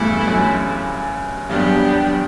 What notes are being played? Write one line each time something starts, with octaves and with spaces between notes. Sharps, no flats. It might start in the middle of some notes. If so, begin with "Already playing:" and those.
Already playing: E2 G2 A3 E4 A4
F#2
E2 G2 F#3 B3 D4 G4